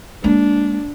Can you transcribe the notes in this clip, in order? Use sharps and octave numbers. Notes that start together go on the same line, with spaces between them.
G#3 A#3 D4